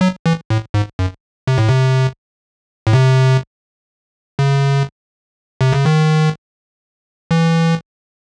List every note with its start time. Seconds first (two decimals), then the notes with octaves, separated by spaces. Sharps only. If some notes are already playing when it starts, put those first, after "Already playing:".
0.01 F#3
0.26 E3
0.50 A2
0.74 G#2
0.99 F#2
1.47 C3
1.58 A2
1.69 C3
2.87 A2
2.93 C3
4.39 C#3
5.61 C3
5.73 C#3
5.85 D#3
7.31 E3